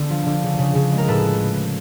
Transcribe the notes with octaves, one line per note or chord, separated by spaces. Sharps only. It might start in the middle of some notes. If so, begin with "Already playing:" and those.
Already playing: D3 B3
F3
D3
C#3
C#3
C#3
G#3
A#4
A2 A4 B4